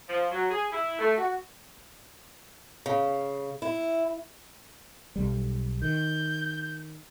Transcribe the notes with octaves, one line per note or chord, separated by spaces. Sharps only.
F3
F#3
G#4
E4
A3
F#4
C#3
E4
B1 G3
D#3 G6